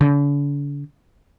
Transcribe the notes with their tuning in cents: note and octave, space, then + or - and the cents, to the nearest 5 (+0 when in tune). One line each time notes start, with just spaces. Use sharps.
D3 -45